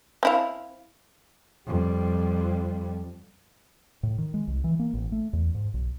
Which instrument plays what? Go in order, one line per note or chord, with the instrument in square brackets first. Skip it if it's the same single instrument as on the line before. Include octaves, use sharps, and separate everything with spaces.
[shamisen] C4 E4 F5
[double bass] F2 G3
[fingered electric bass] A2
D#3
G#3
C2
E3
A#3
A1
A3
E2
G#2
B1